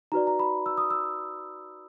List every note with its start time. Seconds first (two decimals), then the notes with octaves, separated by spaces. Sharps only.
0.12 D#4 F#4 B4 D5 A#5
0.27 A#5
0.39 B5
0.66 E6
0.77 D#6
0.91 E6